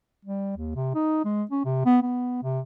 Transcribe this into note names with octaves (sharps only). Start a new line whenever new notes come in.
G3
D#2
C3
D#4
G#3
C#4
C3
B3
B3
C3